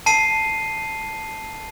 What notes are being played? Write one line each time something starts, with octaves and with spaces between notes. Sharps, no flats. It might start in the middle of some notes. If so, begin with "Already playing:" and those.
A5 C7 D#7